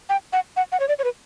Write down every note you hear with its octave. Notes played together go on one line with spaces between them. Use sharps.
G5
F#5
F#5
F#5
C#5
D5
C#5
B4